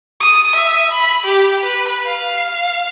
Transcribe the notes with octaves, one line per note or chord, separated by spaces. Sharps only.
D#6
E5
B5
G4
B4
F5
F5